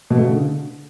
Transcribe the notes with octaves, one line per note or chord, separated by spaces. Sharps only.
B2
A3
C#3
D3